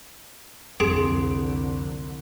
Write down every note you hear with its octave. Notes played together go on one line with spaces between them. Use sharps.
C2 F2 D3 C4 G#4 D6